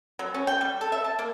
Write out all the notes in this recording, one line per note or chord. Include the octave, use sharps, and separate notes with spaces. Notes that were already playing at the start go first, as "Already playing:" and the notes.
F#3
C#4
G5
G3
A4
E5
A5
A#3